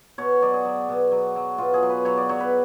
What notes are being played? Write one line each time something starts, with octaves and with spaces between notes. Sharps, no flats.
B2 C#5
F#3 D5
G#4
F#3
B2
F#3
F#3
B2 F4
G#4
F#3
B4
F#3 C#5
D5
F#3 C#5
B4